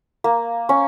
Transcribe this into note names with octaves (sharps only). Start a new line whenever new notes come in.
A#3
C#4